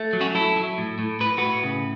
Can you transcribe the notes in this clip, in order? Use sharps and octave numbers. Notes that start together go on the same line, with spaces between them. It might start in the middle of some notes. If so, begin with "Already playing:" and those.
Already playing: A3
F#3
C#4 F#4
F#3 E4 A4
F#3
A2
A2
A2 B4
A2 F#4 B4
C#3